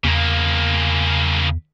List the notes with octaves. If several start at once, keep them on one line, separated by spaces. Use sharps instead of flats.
E2 C#3 A#3